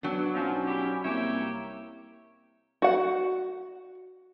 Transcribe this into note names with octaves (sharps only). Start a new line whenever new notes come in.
F#3 B3 D4
B1 F3 C#4
E4 G4
C2 A#3 G4 C#5 E5
F#4 F#5